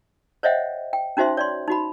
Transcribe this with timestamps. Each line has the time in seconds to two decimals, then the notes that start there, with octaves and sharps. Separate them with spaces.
0.43 C5 C#5 D#5 E5 F#5 G5
0.93 G5
1.17 C#4 D#4 F#4 C5 E5 C6
1.37 C#5 D5 C6
1.68 D#4 F#4 B5